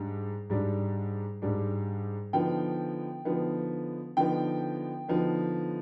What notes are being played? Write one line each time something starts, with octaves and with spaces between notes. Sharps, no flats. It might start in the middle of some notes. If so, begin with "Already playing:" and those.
Already playing: G#2 G3 D4
G#2 G3 D4
G#2 G3 D4
D3 F3 B3 D#4 G5
D3 F3 B3 D#4
D3 F3 B3 D#4 G5
D3 F3 B3 D#4